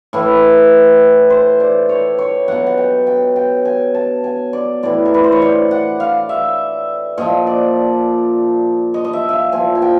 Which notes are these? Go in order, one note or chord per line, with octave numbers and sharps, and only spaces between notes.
A2 E3
C5
D5
C#5
C#5
B2 F#3 F#5
F#5
G5
G5
G5
G#5
A5
G#5
D5
A2 E3 D5
A#4
B4
C5
C#5
D5
F#5
F5
E5
A#2 F3 D#5
D5
D#5
D#5
E5
E5 F5
A#2 F3 G#5
G#5
G5